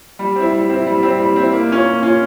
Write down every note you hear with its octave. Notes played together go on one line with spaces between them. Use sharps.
G3
C4 E4
G3
C4 E4
G3
C4 E4
G3
C4 E4
A#3
C#4 F4
A#3
C#4 F4